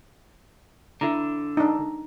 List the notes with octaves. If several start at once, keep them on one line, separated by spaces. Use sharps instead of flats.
D3 E4 A#5
D4 D#4